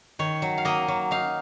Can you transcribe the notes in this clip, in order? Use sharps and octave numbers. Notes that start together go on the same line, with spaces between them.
D#3 C#5
F#3
F5
A#3 D#5
F#3
D#4 F5